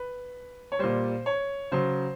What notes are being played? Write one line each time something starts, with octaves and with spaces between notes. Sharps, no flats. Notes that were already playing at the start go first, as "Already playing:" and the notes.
Already playing: B4
C#5
A#2 G3 C5
C#5
C#3 F#3 C5